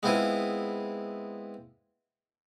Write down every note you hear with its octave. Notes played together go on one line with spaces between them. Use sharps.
G#3 B3 C4 E4 F4 G#4